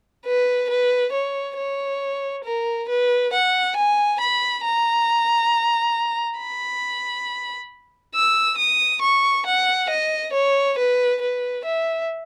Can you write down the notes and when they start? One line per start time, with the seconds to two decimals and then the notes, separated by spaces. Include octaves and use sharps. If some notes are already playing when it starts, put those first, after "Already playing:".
0.26 B4
0.69 B4
1.13 C#5
1.57 C#5
2.44 A#4
2.89 B4
3.33 F#5
3.76 G#5
4.20 B5
4.64 A#5
6.39 B5
8.15 E6
8.58 D#6
9.02 C#6
9.46 F#5
9.89 D#5
10.33 C#5
10.78 B4
11.21 B4
11.65 E5